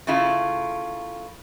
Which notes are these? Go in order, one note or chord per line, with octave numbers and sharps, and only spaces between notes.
C#3 A3 E4 F4